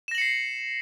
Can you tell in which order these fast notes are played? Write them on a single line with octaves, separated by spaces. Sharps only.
E7 A#6 F#7 C#7 C7